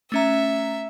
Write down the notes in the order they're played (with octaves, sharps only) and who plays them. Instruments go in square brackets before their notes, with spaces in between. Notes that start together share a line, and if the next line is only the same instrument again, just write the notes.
[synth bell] A3 C#4 A#5 [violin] E5